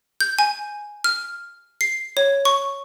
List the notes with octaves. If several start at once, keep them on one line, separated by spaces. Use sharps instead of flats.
G6
G#5
F6
C7
C#5
C#6